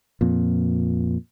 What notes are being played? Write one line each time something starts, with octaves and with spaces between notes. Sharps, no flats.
F2 A#2